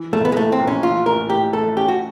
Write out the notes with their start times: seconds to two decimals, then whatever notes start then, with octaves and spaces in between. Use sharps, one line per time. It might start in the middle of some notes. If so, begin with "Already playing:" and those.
Already playing: E3
0.13 A#1 A3
0.25 B3
0.32 G#3
0.37 A2 A3
0.52 C4
0.60 A#1
0.67 C#4
0.83 E3 F4
1.06 A1 A#4
1.30 A2 G4
1.53 A3 A4
1.76 C#4 G4
1.88 F#4